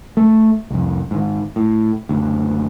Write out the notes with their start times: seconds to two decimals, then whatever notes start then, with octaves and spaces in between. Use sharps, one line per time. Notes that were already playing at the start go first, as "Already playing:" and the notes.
0.17 A3
0.71 C2 F2
1.11 G#2 D#3
1.56 A2
2.09 F#1 D2